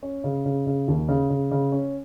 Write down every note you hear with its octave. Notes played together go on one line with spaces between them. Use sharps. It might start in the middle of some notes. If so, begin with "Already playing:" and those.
C#4
C#3
C#3
C#3
D#2
C#3
C#3
C#3
C#4